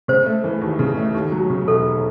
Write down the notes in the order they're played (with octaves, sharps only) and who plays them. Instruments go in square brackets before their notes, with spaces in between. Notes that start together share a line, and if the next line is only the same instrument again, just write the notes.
[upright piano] C#3 [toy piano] C5
[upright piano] A3
E3
D#2
C#3
A3
D#2
F#3
C#3
[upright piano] E1 [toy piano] A4